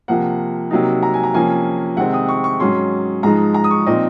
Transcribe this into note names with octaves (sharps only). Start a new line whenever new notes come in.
C3 F3 A#3 F#5
C3 F#3 A#3 D#4
A#5
G#5
A#5
C3 F3 A#3 C#4 G#5
C3 D#3 G#3 C4 F#5
D#6
C#6
C#6
G#2 F#3 C#4 C6
G#2 F3 G#3 D#4 A#5
A#5
D#6
C#6
A#2 F3 C4 D#4 D#5